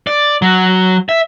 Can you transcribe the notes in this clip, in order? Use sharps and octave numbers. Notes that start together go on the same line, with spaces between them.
D5
F#3
E5